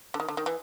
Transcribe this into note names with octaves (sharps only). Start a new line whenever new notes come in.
D3
D#3
D3
D#3
E3